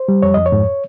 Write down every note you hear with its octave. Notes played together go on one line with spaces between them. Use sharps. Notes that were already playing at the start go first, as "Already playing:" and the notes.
Already playing: C5
G3
F2 C#5
F2 D#5
C#5
G#2